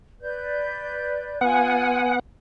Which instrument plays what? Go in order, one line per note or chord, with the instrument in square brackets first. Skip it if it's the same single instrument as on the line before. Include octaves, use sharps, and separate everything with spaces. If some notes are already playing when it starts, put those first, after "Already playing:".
[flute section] B4 D5 G6
[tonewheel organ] B3 F#5 [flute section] F4 G#5